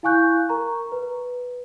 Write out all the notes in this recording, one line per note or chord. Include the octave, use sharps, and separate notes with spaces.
E4 F5 G#5 C#6 F#6 G6
A#4 A#5 C#6
B4